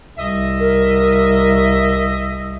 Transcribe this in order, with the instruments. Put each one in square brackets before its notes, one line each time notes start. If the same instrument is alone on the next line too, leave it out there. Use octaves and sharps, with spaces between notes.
[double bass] C2 [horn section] D#5 E5
[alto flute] A#4